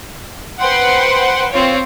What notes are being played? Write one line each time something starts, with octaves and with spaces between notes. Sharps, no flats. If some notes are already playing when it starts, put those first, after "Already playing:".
B4 C5 F#5 G5 C6
C4 F4 C#5